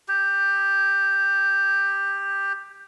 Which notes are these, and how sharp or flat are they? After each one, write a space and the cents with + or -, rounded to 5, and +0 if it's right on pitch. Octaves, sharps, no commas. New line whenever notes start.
G4 +10